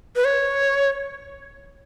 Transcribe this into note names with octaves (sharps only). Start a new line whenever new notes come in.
B4
C#5